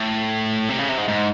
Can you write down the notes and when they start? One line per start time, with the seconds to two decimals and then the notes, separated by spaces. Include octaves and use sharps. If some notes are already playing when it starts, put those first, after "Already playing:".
Already playing: A2
0.69 C3
0.79 C#3
0.89 C3
0.98 G#2
1.08 G#2